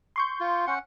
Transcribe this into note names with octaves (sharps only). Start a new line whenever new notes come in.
C6 C#6 G6
F4
C#4 F#5